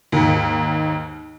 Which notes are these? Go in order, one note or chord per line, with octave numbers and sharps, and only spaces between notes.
D#2 G#2